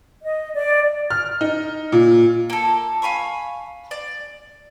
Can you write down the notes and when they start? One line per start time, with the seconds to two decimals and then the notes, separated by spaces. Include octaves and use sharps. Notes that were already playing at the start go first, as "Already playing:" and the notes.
0.22 D#5
0.55 D5
1.11 F6
1.41 D#4
1.92 A#2
2.50 A#3 A4
3.02 F5 G#5 B5 C#6
3.91 D5